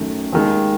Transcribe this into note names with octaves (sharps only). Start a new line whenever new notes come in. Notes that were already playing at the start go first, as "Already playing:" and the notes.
Already playing: F#2 D#3 A3
D#2 D#3 G#3